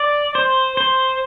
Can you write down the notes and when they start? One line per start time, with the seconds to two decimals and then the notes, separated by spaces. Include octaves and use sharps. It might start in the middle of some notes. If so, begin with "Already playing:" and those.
Already playing: D5
0.35 C5
0.77 C5